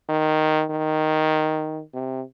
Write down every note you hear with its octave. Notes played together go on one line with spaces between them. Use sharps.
D#3
D#3
C3